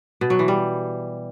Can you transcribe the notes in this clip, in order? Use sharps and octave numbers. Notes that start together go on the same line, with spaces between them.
B2
F#3
E3
G3